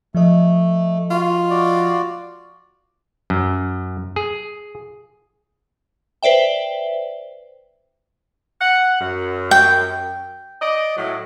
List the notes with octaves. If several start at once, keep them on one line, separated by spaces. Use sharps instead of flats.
F3 A3 D#5
F4 F#4
F#4 D5
F#2
G#4
B4 C5 D5 E5 G5
F#5
F#2
G5
D5 D#5
A2 F#3